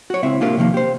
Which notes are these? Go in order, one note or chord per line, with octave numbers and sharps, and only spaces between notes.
F#4 C#5
C#2 C4 E4 E5
A#3 D4 F4 G4 A#4
C3 D#3 F3 A#3
G4 C5